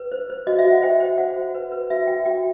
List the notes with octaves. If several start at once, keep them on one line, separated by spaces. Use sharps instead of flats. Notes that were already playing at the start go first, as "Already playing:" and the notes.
Already playing: B4
C5
C5
F#4 D#5
E5
F#4
F#5
C5 G5
C5
C5 F#5
F#4
B4
B4
F#4 E5
F#4 G5
F#4 G5